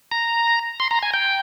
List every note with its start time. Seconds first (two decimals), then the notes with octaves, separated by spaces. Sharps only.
0.12 A#5
0.80 C6
0.91 A#5
1.03 G#5
1.14 G5